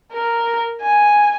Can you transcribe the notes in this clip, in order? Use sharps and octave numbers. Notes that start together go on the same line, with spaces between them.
A#4
G#5